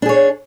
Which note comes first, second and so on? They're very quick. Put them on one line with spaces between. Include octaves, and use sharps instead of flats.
D4 G#4 C#5